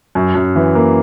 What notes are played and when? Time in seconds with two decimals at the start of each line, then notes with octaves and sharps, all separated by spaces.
0.15 F#2
0.35 F#2
0.56 E3
0.75 A#3